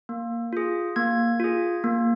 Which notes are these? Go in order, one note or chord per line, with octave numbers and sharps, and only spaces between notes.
A#3
F4 G#4
A#3 G#6
F4 G#4
A#3